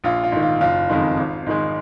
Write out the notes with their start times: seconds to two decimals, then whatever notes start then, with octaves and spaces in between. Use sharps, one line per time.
0.04 A#1 F4
0.24 F4
0.32 G#2 D#3
0.42 F4
0.61 F#1 F4
0.89 F2 D#3 G#3
1.17 G#1
1.46 G#2 D#3 G#3